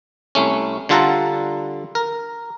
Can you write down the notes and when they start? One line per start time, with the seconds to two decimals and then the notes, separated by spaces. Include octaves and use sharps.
0.35 C2 A3 C#4
0.89 D3 G3 F4 A4 F#5 A#5
1.95 A#4